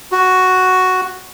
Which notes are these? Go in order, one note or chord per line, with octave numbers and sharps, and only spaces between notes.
F#4